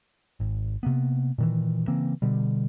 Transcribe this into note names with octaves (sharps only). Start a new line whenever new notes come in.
G#1
C3 A#3 B3
A#2 D#3 E3
C#3 E3 A#3 C4
B2 D3 G3